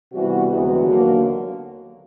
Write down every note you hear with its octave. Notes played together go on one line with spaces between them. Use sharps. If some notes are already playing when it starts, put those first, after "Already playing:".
C3 E3 G3 B3 F#4
D2 C3 E3 G#3 B3 F#4
D#2 D3 F#3 A#3